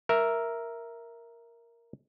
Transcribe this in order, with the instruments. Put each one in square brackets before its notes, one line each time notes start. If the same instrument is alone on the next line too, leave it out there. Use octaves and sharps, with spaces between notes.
[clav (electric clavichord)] A#4 E5